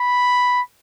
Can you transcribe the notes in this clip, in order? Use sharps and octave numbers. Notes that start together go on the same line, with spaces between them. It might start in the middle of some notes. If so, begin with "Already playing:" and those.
Already playing: B5